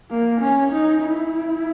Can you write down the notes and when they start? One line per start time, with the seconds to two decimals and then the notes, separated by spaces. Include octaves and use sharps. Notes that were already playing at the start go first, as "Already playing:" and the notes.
0.10 A#3
0.41 C#4
0.72 D#4
1.04 E4